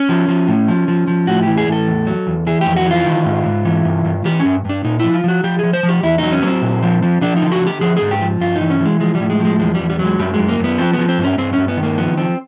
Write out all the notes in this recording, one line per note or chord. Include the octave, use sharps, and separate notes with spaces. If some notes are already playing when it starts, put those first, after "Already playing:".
Already playing: C#4
F3
F3
A2
F3
F3
F3
A2 F#4
E3 G4
G#4
A2 A4
E2
F#3
E2
E3 G#4
F2 G4
F#4
E3 F4
D#3
G#2
G#2
E3
G2
G2
E3 G4
C#4
G2
G2 D4
A#2 D#4
F3 E4
F4
F3 F#4
F3 G4
F3 G#4
C5
F3
G4
E2 E4
F#3 D#4
C#4
F#3 B3 C4
A#2
F3
F3
F3 D4
D#4
D3
F#4
D3 G4
F3 G#4
G#2 G#4
G4
F3
G2 F4
D#4
E3
C#4
E3 G#3
F3 G#3
G3
A2
G#3
F3
G#3
E2 G#3
E2 G3
G3
F#3
G#3
F#2 G3
G#3
F#2
A#3
F#2 B3
F3 C4
F3 B3
C4
G2 C#4
G2 C4
G2 C#4
B3
D#3
A#3
F3 B3
F3 C4